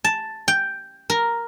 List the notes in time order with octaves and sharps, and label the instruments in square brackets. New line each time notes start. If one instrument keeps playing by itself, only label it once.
[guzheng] A5
G5
A#4